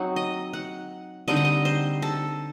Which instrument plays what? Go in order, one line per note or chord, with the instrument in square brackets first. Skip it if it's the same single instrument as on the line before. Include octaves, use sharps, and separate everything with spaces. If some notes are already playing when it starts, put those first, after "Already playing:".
Already playing: [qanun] F#3 C4 D#4 F#5
D#5
F#5
D3 G3 C4 D#4 D#5
F#5
D#5
C5
A4